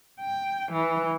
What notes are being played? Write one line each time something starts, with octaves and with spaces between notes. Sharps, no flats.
G5
E3